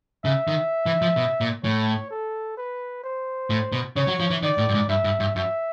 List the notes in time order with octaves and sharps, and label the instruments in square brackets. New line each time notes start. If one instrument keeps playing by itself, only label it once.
[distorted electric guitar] C#3 [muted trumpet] E5
[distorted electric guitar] D#3
E3
F3
B2
A#2
[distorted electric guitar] A2 [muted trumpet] C#5
[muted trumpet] A4
B4
C5
[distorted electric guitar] A2
B2
[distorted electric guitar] C#3 [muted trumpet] C#5
[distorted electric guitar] F#3
F3
E3
[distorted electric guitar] D#3 [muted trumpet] D5
[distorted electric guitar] A2
G2
G#2
[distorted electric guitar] G2 [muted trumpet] E5
[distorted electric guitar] G2
G2
[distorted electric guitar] F#2 [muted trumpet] E5